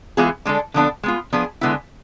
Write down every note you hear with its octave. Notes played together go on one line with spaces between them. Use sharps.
E3 G#3 B3 F4 G#4
D3 G#3 D4 A4
D3 F3 B3 D4 A4
G#3 B3 F4
F3 B3 D4 G#4
D3 G#3 B3 E4